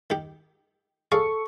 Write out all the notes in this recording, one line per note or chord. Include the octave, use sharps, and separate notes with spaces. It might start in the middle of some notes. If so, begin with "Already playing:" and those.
D#3 G4
G#4 A4 D5 F5 C#6